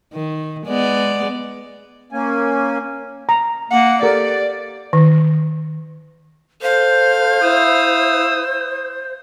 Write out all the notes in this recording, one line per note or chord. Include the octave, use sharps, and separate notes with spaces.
D#3
G#3 B3 D5
A#3 C#4 G#5
A#5
A#3 F#5
G4 A4 A#4 D5
D#3
A4 C5 F5
E4 D#6 E6